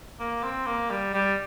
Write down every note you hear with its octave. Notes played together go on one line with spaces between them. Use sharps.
A#3
C4
A#3
G3
G3